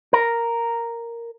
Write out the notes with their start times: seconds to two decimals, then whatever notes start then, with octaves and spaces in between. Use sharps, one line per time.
0.13 A#4